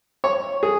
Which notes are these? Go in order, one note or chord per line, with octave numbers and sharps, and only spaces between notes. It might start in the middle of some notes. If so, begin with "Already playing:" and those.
C#5
G#4